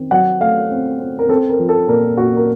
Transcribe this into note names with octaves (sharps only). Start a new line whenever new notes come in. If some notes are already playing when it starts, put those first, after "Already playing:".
Already playing: D#3 C4
F#3 F#5
A3 F5
C4
C4
A#4
C4 A4
A#4
F3
A4
A#2 A#4
A#2 F#4
A#4